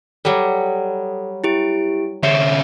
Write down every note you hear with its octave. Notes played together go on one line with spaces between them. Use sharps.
F#3 G3 A4
E4 G4 D7
D3 C#4 C5 E5